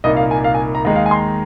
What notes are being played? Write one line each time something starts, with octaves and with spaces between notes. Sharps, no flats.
C2 A#2 A#3 D#4 D#5
F5
G#5
F5
G#5
A#5
D#2 D#3 G#3 D#4 A#5
F5
G#5
C6
A#5